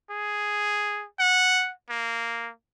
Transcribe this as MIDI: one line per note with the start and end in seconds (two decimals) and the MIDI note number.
0.10 1.05 68
1.20 1.72 78
1.90 2.51 58